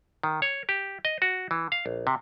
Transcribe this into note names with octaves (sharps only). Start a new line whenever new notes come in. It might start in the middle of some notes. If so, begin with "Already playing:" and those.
D#3
C#5
G4
D#5
F#4
E3
F5
A#1
C3